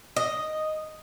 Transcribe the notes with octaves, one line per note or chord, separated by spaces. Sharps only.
D#5